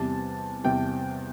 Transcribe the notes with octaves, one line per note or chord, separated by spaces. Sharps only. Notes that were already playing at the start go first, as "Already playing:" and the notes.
Already playing: E2 C3 G3 A5
E2 C3 G3 G5